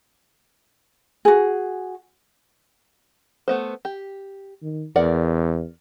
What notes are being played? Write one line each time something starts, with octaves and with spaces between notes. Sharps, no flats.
F#4 G#4
A3 B3 C5
G4
D#3
E2 A#4 D5 F#5